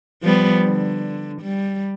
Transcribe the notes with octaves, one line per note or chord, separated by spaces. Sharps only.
F3 G3 B3
D3
G3